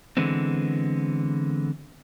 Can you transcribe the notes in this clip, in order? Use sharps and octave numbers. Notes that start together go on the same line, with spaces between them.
D3 E3 G#3 B3 C4